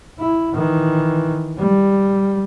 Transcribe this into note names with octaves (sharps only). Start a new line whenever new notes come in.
E4
D#3 E3
G3